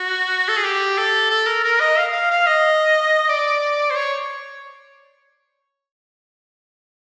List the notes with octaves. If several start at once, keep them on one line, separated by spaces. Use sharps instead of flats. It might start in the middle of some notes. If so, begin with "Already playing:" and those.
Already playing: F#4
A4
G#4
G4
A4
A4
A#4
A#4
D#5
F5
F5
F5
D#5
D5
C5
C#5